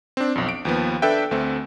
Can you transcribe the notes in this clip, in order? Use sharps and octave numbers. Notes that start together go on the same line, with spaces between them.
C4 D4
B1 F2
D7
D#2 F3 B3
D4 A4 B4 E5 G5
D2 A3 C4